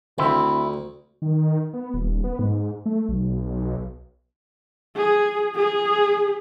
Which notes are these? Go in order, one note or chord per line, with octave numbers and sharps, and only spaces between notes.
D2 C4 E4
D#3
B3
D#1
B3
G#2
A3
B1
G#4
G#4